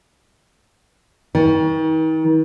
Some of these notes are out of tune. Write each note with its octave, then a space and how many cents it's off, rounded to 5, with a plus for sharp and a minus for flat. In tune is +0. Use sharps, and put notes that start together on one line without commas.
D#3 +40